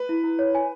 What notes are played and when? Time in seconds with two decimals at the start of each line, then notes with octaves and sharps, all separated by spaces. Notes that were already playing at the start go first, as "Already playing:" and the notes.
Already playing: B4
0.09 E4
0.24 E4
0.39 C#5
0.55 G#5